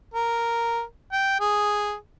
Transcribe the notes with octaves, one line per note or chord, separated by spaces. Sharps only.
A#4
G5
G#4